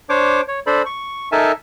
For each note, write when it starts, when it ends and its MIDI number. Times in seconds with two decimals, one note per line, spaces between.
0.09 0.41 62
0.09 0.41 72
0.09 0.41 73
0.09 0.41 86
0.48 0.60 73
0.67 0.83 62
0.67 0.83 69
0.67 0.83 72
0.67 0.83 74
0.67 0.83 83
0.86 1.29 85
1.32 1.52 63
1.32 1.52 69
1.32 1.52 70
1.32 1.52 76
1.32 1.52 80
1.32 1.52 81